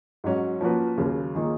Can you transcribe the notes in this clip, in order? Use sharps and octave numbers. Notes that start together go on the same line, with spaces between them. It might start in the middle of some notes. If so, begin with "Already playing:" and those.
G#2 F#3 C#4 F#4
F3 A#3 C#4 F#4 B4
D#2 C#3 F#3
D#3 A#3 F4 G#4